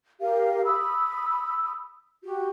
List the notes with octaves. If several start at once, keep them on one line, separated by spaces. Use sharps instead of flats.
G4 A#4 F5
B5 D#6 E6
F#4 G4